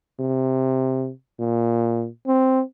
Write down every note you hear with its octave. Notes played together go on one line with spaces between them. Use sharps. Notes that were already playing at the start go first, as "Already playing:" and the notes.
C3
A#2
C4